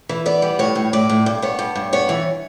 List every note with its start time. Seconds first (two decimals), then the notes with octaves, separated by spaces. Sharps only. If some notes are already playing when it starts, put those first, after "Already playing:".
0.09 E3
0.26 B3 D5
0.42 G3
0.59 A2 C#5
0.75 A2
0.93 A2 D5
1.09 A2
1.26 G2
1.42 B3 C#5
1.59 G2
1.75 G2
1.93 B3 C#5
2.09 E3